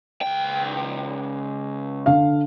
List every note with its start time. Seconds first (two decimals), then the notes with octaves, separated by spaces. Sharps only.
0.22 C#2 G5
2.06 D3 F5